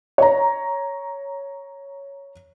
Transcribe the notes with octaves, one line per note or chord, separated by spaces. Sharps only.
C#5 A#5